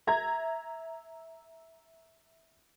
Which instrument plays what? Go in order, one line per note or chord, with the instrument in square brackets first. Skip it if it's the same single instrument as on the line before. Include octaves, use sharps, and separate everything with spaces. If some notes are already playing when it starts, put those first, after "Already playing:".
[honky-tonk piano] E5 A#5 G#6